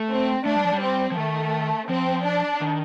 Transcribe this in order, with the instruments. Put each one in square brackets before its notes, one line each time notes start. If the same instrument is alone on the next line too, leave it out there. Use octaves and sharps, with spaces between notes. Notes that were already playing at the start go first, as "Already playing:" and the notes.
Already playing: [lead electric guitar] A3
[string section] C4
[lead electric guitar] A3 [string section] D4
[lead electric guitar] G3
F3
G3
[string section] C4
[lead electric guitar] F3
[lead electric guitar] D#3 [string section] A3
[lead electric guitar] F3 [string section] C4
[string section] D4
[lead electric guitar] D#3